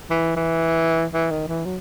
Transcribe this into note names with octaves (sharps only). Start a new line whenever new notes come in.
E3
E3
E3
D#3
E3
F#3